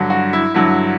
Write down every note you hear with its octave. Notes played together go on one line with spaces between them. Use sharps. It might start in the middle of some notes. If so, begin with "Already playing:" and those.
Already playing: G2 D3 F#3
F#4
E4
G2 D3 F#3 E4